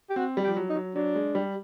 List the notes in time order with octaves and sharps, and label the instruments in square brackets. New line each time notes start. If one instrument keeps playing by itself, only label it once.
[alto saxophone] G4
[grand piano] C4 [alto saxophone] F#4
[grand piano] G3
[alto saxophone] G4
[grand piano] F3
F#3
[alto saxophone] D#4
[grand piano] F#3
[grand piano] F#3 [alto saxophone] D4
[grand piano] G#3
G3